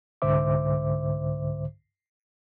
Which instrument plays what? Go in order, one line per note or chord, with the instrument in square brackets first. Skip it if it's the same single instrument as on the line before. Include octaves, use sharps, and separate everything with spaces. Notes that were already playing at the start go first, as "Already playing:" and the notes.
[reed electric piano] C2 G#2 D3 C5 E5 D6